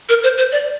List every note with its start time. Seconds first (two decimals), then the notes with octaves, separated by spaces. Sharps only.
0.09 A#4
0.23 C5
0.38 C5
0.52 D5